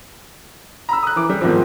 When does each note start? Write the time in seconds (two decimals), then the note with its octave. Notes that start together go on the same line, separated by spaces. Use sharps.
0.89 A#5 B5 E6
1.03 D#6 F#6
1.16 E3 D6
1.29 G3
1.41 E2 G#2 D#3 F3 C4